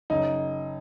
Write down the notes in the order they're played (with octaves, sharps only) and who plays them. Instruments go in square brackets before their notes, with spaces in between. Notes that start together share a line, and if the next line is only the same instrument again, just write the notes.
[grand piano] F#1 D#4